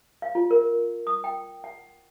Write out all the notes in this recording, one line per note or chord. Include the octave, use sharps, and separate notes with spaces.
F5
F4
A#4
D#6
G5
F#5